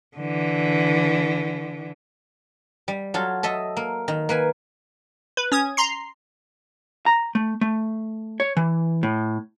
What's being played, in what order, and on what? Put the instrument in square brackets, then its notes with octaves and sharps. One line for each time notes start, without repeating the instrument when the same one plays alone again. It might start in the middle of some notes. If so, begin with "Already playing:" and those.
[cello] D3 E3
[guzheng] G3
F#3 F4 A4
A4 D#5 E5
A#3
D#3
A#3 B4 G#5
[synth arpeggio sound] B4
C#4 D#6 G#6
A#5 C6 C7
[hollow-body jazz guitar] A#5
A3
A3
C#5
E3
A2